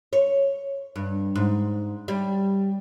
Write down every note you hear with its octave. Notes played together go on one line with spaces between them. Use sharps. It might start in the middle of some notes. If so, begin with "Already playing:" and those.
C#5
G2
G#2
G3